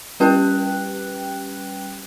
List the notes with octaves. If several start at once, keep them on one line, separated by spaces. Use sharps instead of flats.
G3 C#4 G4 B4 G5 F#6